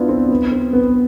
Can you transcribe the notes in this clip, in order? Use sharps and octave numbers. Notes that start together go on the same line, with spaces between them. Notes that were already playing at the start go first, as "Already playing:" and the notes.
Already playing: B3 D4 E4 F4
C4
B3
C4
B3